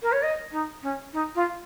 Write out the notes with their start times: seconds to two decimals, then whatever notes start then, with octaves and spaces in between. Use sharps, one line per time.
0.02 A#4
0.12 C#5
0.22 D#5
0.51 D#4
0.82 C#4
1.13 D#4
1.35 F4